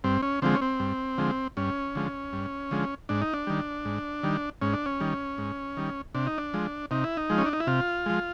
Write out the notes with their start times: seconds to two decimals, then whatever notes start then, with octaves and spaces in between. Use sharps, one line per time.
0.04 G2 C4
0.23 C#4
0.42 D3 F3 G#3 C4
0.55 C#4
0.62 C4
0.80 G2
1.18 D3 F3 G#3
1.57 G2 C#4
1.95 D3 F3 G#3
2.33 G2
2.71 D3 F3 G#3
3.09 G#2 D4
3.22 D#4
3.34 D4
3.47 D#3 G3
3.85 G#2
4.23 D#3 G3
4.62 G#2 C#4
4.74 D4
4.86 C#4
5.00 D#3 G3
5.38 G#2
5.77 D#3 G3
6.15 C3 D4
6.27 D#4
6.38 D4
6.54 F3 G#3
6.91 C3 D#4
7.04 E4
7.17 D#4
7.30 F3 G#3
7.38 C#4
7.46 D4
7.53 D#4
7.60 E4
7.67 C3 F4
8.06 F3 G#3